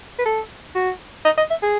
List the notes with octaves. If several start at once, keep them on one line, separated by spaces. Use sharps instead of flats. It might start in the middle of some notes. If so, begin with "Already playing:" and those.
B4
A4
F#4
D#5
D#5
E5
G#4